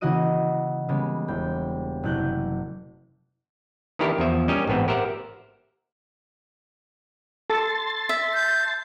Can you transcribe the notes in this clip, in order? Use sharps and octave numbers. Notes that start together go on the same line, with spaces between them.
C#3 E3 A#3 F#4 D#5 D#7
C#3 G3 G#3 A#3 B3
E1 G5
F#1 C3 A3 F#6 G6
D#3 E3 D4 E4 G4 A#4
E2 F3 E5
G3 C#4 G4 A#4 D#5
A1 G#2 B3 C4 E5
G4 A#4 C5 E5 F#5
A4 A5 C6 A6
E5
G6